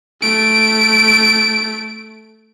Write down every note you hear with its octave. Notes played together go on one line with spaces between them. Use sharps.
A3 D7